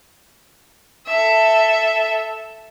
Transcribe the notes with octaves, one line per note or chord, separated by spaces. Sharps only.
A4 E5